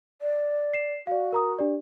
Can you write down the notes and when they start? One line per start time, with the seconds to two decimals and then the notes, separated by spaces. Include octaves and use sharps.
0.22 D5
0.73 C7 E7
1.07 F#4 D5 F5
1.33 A#4 A#5 D#6
1.59 D4 G4 D5